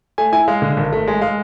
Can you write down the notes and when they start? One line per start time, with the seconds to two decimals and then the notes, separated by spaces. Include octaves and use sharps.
0.18 A3 G#5
0.33 E4 G#5
0.48 G#3 F5
0.62 D3
0.77 G#1
0.93 A3
1.08 G#3
1.21 G#3 F5